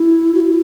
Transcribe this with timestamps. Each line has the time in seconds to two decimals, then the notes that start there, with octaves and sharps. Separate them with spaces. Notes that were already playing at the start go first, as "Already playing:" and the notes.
Already playing: E4
0.35 F#4
0.40 E4